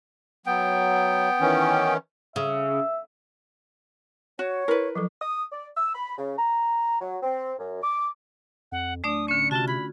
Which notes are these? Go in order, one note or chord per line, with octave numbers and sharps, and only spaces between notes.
F#3 B3 G5
D#3 E3 C#4
C#3 E5
F#4 C#5
E4 A#4 B4
F3 F#3 A4
D#6
D5
E6
B5
C#3
A#5
F#3
C4
F#2
D6
F2 F#5
D1 A3 D4 D5 D#6
D3 C#4 C#7
C3 F4 F#4 A5
B5 G#6